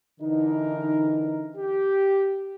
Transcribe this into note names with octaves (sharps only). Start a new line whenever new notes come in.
D3 E3 D#4 A#4
G4